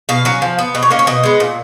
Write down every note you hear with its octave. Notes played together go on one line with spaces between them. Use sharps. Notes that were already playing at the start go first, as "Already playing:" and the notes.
B2 F5
F#3 C#4
F3
B3
B2 D#5
C#5
A#3 C#4 D#5
C#5
B2 D#5
G#3 B3
A#2